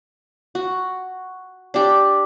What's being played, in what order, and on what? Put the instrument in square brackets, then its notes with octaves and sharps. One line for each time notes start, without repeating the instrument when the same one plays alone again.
[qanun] F#4
D4 G4